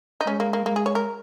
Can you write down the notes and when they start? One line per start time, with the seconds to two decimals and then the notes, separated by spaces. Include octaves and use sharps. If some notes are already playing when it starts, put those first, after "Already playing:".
0.21 D#4
0.27 G#3 C#4
0.40 A#3
0.53 A#3
0.66 G#3 A#3
0.76 G#4
0.86 C#5
0.95 A#4